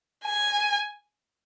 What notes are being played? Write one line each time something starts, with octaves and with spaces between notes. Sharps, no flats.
G#5